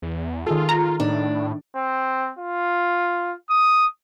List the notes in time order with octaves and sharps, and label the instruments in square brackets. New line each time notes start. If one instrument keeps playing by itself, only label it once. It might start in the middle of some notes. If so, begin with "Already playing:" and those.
[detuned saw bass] E2
[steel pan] D#3 G#4 A4 [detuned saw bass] F4
[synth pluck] A#5
[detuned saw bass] A2 [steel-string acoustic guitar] D4 [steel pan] D#4
[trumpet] C4
F4
D#6